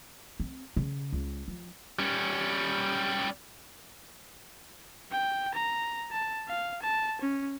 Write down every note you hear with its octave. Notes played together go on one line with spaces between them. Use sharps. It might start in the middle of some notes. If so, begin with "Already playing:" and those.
C4
C#3
C#2
F3
G3 C#4
G5
A#5
A5
F5
A5
C#4